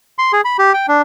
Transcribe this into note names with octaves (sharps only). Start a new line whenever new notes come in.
C6
G#4
B5
G4
G5
D4